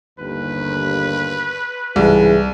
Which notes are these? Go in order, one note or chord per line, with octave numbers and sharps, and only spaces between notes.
G1 D#2 B4
C2 G#2 C#3 E3 G#4